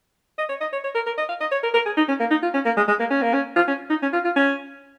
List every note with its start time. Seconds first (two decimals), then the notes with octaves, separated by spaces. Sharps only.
0.38 D#5
0.49 C#5
0.61 D#5
0.73 C#5
0.84 C#5
0.95 A#4
1.06 A#4
1.18 D#5
1.29 F5
1.41 D#5
1.52 C#5
1.63 A#4
1.74 A#4
1.85 G#4
1.97 D#4
2.08 C#4
2.20 A#3
2.31 D#4
2.42 F4
2.54 C#4
2.65 A#3
2.77 G#3
2.88 G#3
3.00 A#3
3.10 C#4
3.22 A#3
3.33 C#4
3.56 F4
3.68 C#4
3.90 D#4
4.02 C#4
4.13 F4
4.24 F4
4.36 C#4